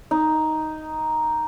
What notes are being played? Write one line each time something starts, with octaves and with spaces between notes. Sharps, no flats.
D#4